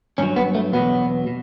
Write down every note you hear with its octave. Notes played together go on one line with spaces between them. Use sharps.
G2 F#3 C#4
B3
A3
E2 B2 F#3 B3
B2